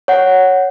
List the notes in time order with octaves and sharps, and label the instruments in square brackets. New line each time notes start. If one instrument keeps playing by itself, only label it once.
[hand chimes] C#5 F#5